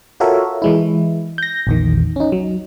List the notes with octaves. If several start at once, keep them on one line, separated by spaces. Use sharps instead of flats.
F4 F#4 A4 A#4 C#5 E5
E3 G#3 E4
G6 A#6
A#1 E2 D#3
C#4 D#4
F#3